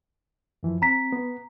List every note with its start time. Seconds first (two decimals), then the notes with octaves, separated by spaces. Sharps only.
0.63 F#2 E3 F3
0.82 C4 A#5 B6
1.12 B3